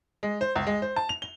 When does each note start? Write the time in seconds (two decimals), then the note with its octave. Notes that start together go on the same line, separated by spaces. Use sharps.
0.23 G#3
0.41 C5
0.55 C#2
0.67 G#3
0.82 C5
0.96 A5
1.09 F7
1.22 G7